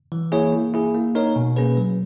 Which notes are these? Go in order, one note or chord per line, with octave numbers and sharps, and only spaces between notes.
E3
A#3 E4 G#4 C#5
A#3
E4 G#4
A#3
D#4 A#4 C#5
B2
A#3 C#4 G#4 B4
F#3